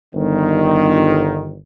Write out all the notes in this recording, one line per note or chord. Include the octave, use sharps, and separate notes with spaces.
G1 D#3